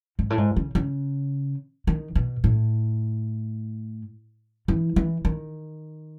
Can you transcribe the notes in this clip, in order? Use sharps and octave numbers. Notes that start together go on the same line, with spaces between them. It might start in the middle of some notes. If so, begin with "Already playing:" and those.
G#2
A2
G#2
C#3
C#3
D#3
B2
A2
E3
E3
D#3